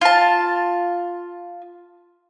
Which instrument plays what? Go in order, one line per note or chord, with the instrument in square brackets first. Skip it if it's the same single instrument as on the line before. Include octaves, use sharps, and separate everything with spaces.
[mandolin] F4 A5